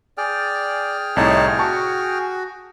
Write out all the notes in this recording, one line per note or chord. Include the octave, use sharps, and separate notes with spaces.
G#4 D5 G5 F6
C2 A2 D#4 C#5 A5
F#4 A5 C#6